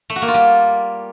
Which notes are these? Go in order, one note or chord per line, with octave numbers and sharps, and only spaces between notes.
A3
F#4
A#3
F4
G3